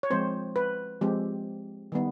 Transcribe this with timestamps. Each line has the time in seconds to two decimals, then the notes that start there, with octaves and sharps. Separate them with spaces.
0.03 C#5
0.10 F3 G#3 C4 C5
0.56 B4
1.01 F3 G#3 C4 G4
1.92 D#3 G3 B3